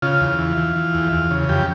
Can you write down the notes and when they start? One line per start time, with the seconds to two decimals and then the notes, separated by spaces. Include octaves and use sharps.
0.02 C#3 F4
0.21 E2
0.39 E3
0.57 E3
0.76 E3
0.94 E2
1.12 E2
1.31 C#3
1.49 F2 G4